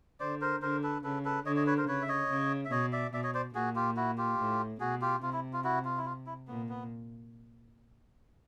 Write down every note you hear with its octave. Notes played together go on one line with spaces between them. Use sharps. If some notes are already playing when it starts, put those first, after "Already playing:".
D3 C5 D5
A#4 C5
D3 A#4 C5
A4 B4
C#3 A4 B4
A4 B4
D3 C#5 D#5
C#5 D#5
B4 C#5
A#4 C5
C#3 B4 C#5
E5
C#5 D#5
C#3
E5
B2 C#5 D#5
D5 E5
B2 D5 E5
C#5 D#5
C5 D5
A#2 F#4 G#4
F4 G4
E4 F#4
F4 G4
A2
B2 F#4 G#4
F4 G4
C3 F4
E4
F4
E4 F#4
F4
E4
F4
E4
A#2 B3
B3